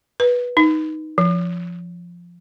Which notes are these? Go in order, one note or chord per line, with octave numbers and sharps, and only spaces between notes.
B4
D#4
F3